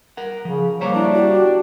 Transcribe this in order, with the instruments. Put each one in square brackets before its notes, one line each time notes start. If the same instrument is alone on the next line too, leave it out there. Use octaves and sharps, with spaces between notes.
[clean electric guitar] A#4 F#5
[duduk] C#3 [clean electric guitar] F3
[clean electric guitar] G3 C5 A#5 [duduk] A#3 [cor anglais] C#5
[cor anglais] D4 [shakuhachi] E4
[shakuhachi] F#4 [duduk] G4